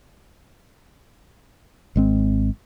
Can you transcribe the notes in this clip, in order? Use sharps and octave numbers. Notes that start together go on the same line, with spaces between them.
G#1 G#3 C4